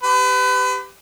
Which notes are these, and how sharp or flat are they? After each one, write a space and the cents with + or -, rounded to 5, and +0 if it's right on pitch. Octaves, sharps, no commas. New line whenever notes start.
G4 +0 B4 +35